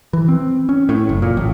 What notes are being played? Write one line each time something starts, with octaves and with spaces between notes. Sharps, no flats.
E3
C4
C#4
A2
F#1
A#2
A1